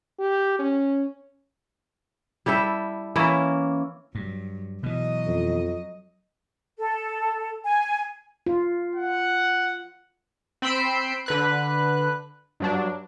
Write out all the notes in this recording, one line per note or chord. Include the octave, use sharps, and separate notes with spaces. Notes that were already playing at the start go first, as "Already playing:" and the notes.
G4
C#4
G3 E4 A4 E5
E3 A#3 C#4 E4
G2 F#3
B2 E3 F#3 D#5
F2
A4
G#5
F4
F#5
C4 B5 C6 E6 C7 D7
D3 B4 F#6
G2 F#3 D4